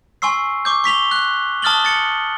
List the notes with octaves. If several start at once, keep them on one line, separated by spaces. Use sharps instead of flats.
G#5 C6 C#6 E6 C7
C#6 D6 G6
C#6 B6 F7 G7
F#6
A5 D#6 F6 A6 F#7 G7
A6 C#7 F#7